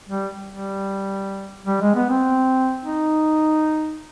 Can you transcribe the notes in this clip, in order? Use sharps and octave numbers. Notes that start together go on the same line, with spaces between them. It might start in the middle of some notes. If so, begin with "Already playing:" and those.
G3
G3
G3
G#3
B3
C4
D#4